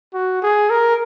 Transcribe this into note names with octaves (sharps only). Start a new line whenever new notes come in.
F#4
G#4
A#4